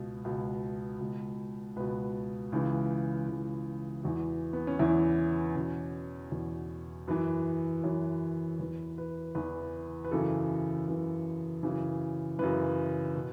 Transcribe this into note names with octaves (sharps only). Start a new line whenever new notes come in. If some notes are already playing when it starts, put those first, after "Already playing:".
Already playing: C#2 B2
C#2 B2
C#2 B2
C#2 B2 B4
C#2 C#3 E3
C#2 C#3 E3
E2 E3 F#4
B3
C#4
E2 E3 E4
E2 B2 C#4
E2 B2
F#2 E3 B4
F#2 E3 C#5
E2 E3 B4
B4
E2 E3 B4
B4
F#2 C#3 E3 A4
F#2 C#3 E3 B4
F#2 C#3 E3
F#2 C#3 E3 B4
B2